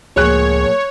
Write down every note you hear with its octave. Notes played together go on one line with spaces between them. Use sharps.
C#2 A2 F3 A#3 G#4 C#5 F#6